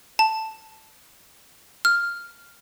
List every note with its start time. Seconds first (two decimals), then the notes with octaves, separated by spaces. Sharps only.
0.19 A5
1.85 F6